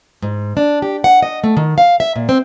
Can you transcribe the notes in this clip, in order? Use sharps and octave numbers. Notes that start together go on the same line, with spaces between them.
G#2
D4
G4
F#5
D#5
A3
D#3
F5
E5
A#2
C4